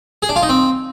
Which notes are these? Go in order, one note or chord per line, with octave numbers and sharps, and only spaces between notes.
G#4
D4
F4
D#4
C4